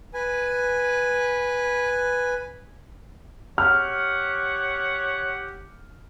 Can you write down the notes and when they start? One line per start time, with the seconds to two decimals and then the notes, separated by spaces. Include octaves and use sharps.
0.14 B4 G#5
3.58 G4 C#5 F#5 F6